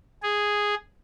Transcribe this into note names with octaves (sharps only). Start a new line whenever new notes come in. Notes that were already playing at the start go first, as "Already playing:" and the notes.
G#4